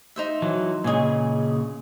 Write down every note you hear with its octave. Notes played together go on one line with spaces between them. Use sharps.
D#4 C5 E5
E3 F#3
A#2 C#3 G#4 D#5 G#5